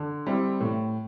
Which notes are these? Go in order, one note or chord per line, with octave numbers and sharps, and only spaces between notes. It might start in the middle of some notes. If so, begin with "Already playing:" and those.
Already playing: D3
G3 C4 E4
A2